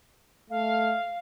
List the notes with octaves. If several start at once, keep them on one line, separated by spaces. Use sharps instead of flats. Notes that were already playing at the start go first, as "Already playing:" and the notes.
A3 F5